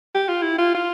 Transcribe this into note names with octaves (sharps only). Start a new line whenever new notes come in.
G4
F4
E4
F4
F4